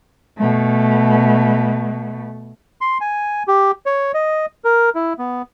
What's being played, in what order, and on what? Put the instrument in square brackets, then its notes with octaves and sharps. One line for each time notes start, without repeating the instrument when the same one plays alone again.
[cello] B2 A3
[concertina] C6
G#5
G4
C#5
D#5
A#4
E4
B3